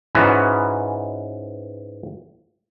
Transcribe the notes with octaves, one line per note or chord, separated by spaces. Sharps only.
G#2 E3 B3 C#4 F#4